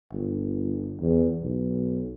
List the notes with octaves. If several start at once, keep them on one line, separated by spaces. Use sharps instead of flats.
G1
E2
B1